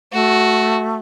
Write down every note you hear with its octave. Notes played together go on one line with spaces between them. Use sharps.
A3 F#4